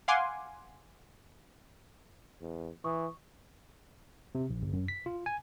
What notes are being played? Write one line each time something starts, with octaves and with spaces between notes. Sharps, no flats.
F5 F#5 G#5 C6 D6
E2
E3 C#6 D#6
C3
A#1
G1
F#2
B6
F4
G#5